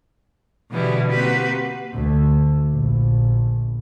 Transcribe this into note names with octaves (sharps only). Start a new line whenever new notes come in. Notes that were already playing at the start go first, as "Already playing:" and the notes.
B2 D3 E3 G3 B3 E4
A#3 C4 F#4 G4 B4
D2
A#1